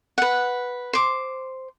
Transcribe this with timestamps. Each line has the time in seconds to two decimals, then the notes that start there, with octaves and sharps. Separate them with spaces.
0.18 B4 F#5
0.93 C5 D6